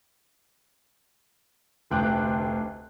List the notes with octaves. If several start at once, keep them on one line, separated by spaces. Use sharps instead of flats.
F1 D2 G5 D6 F#6